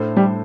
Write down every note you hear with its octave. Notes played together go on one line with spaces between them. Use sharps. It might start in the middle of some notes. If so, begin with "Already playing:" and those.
Already playing: A2 A3 D4 A4 C5
G3